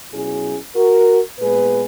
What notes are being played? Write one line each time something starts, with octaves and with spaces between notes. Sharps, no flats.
B2 F#3 C#4 E4 G#4
F#4 A#4
A#2 G#3 B3 G#4 B4